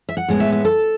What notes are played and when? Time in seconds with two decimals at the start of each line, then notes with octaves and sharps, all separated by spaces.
0.09 E5
0.17 F#5
0.28 A2 G#3 B3
0.40 E5
0.52 E5
0.65 A4